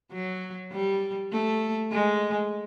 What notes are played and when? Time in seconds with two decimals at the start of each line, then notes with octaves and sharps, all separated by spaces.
0.12 F#3
0.72 G3
1.32 A3
1.92 G#3